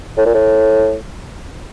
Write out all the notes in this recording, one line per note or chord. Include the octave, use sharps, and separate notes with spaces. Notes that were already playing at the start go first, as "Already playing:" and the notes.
A2
A#2
A2